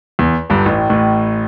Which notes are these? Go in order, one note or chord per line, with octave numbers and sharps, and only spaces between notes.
E2
G1 G2
A1 A2
A1 A2